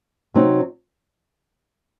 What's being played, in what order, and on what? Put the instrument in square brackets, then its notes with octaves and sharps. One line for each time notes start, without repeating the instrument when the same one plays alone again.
[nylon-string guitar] C3 F#3 C4 D#4